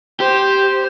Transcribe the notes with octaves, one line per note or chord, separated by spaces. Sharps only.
G4 C5